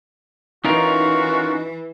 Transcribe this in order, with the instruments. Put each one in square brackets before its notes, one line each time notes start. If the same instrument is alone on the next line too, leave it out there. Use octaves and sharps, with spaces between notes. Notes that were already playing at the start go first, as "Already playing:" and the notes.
[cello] E3 [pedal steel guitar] C#4 F4 A#4 [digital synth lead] D#4 [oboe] F#4